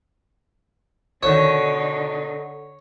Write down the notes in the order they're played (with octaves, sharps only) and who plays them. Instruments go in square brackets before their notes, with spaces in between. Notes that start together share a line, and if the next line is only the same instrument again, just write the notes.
[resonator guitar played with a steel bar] B2 D#3 [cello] D3 D#4 [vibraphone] A4 F#5 [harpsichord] C#5